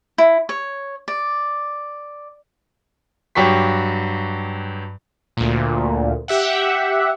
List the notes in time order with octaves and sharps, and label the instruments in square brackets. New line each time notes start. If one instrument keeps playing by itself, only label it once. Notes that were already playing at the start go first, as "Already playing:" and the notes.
[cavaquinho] E4
C#5
D5
[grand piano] G2 F#3 G4 C#6 B6
[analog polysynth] D2 A#2
G4 E5 F#5